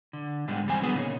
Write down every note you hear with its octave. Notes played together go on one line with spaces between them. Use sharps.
D3
G#2 D3 G3 G#3
E2 G3 C4 G#5
D3 F#3 B3 G#4 B4
A#2 C#3 A#3 D#4 G#4 C#5